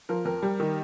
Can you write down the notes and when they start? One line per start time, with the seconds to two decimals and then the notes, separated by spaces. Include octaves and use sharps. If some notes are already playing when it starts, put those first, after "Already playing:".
0.09 F3 A#4
0.25 F2 A#4
0.43 G3
0.60 D#3